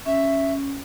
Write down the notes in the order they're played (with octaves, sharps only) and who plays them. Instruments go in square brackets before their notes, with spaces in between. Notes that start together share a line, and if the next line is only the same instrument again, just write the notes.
[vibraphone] C#4 [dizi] E5